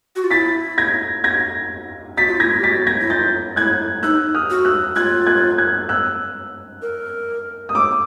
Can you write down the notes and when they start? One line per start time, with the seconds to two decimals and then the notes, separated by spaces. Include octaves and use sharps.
0.16 F#4
0.24 F4
0.31 E4 A6 B6
0.78 G#6 A#6
1.24 G#6 A#6
2.17 F#4 A6 B6
2.27 F4
2.37 E4 G#6 A#6
2.46 F4
2.59 G4
2.63 F#4 A6 B6
2.87 G#6 A#6
3.01 E4
3.10 F4 G6 A6
3.56 E4 F#6 G#6
4.03 D#4 E6 F#6
4.35 D#6 F6
4.50 F#4
4.65 E6 F#6
4.96 F4 F#6 G#6
5.27 F#6 G#6
5.58 F#6 G#6
5.89 E6 F#6
6.82 A#4
7.69 D#6
7.75 D6 E6